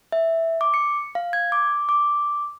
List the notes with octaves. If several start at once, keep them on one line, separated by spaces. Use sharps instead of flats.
E5
D6
C#7
F5
G#6
D6
D6